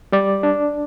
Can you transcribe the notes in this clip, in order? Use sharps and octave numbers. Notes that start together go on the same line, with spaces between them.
G3 D5
D4